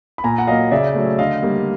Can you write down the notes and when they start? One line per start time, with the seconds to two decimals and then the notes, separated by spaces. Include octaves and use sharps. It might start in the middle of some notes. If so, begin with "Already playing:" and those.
0.18 B5
0.24 A#2 G#5 A#5
0.38 F#5
0.47 F#3 A#3 D#5 F5
0.71 C#3 D5 E5
0.95 F#3 A3
1.19 D3 D#5 F5
1.43 G3 A#3